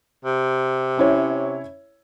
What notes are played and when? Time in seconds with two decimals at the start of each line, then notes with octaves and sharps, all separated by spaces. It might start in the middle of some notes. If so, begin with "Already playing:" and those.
0.25 C3
0.98 C#4 E4 C#5